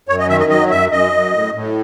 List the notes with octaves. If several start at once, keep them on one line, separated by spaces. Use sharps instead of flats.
F#2 C#5
D#5
D#3 E5
D#5
F#3 D#5
F#2 E5
F#2 D#5
F#2
A2
A2